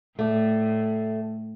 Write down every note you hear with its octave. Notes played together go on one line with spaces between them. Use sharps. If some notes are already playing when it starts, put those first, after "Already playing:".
A2 A3 D5